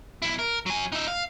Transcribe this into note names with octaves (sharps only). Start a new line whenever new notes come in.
B1 E4
A#4
F#3 G#5
D#4 E5
F5